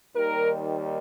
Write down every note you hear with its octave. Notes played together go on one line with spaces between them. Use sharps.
D#2 D#3 G3 A#4